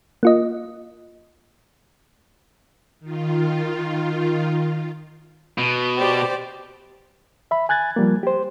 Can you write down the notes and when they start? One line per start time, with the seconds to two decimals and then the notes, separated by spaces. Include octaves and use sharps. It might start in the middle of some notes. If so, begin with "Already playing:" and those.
0.23 A#3 F4 D#5
3.00 D#3 F4
5.58 B2
5.97 G4 C5 D5
7.51 E5 B5
7.69 G#5 F#6 G#6 A6
7.96 F3 G3 A#3
8.23 G4 C5